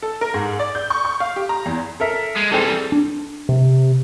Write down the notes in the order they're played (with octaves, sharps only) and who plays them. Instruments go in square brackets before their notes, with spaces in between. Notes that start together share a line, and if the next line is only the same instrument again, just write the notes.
[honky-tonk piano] A4
A#4
G#2
D5
G6
C#6
C#6
F5
G4
A#5
E2
[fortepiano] A4 A#4 E5
[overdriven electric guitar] G#3
[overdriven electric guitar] E3 G3 [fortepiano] C4 G#4 A4
[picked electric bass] D4
[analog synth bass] C3